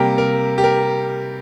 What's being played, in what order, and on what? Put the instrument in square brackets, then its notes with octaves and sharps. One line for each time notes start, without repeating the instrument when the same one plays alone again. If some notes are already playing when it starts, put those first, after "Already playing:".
Already playing: [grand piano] C3 G3 A#3 G4 A#4
A#4
G4
A#4